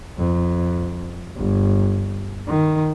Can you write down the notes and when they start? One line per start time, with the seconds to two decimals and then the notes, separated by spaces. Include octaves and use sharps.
0.18 F2
1.37 G1
2.48 D#3